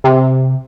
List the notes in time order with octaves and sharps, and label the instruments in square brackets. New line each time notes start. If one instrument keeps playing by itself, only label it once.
[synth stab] C3